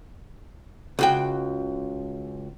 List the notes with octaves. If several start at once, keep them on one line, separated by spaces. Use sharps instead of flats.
C#2 F#4 G5